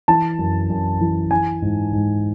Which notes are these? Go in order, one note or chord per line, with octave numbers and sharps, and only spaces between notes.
E3 A5
F#2
F#2
E3
E3 G#5
G#2
G#2